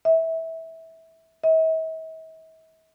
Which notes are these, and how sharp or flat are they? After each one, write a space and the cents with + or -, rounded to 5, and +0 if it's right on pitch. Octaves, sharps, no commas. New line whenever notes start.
E5 -20
E5 -45